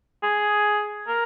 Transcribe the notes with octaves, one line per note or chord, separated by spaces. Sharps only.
G#4
A#4